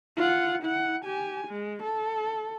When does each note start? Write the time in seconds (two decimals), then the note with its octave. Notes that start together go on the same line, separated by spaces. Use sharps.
0.17 F4 F#5
0.63 E4 F#5
1.05 G4 G#5
1.48 G#3
1.83 A4